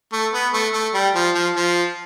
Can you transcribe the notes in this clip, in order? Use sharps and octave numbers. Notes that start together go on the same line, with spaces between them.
A3
B3
A3
A3
G3
F3
F3
F3